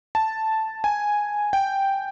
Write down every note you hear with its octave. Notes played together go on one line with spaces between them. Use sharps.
A5
G#5
G5